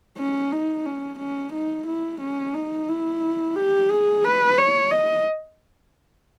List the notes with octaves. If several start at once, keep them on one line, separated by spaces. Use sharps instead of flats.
C#4
D#4
C#4
C#4
D#4
E4
C#4
D#4
E4
G4
G#4
B4
C#5
D#5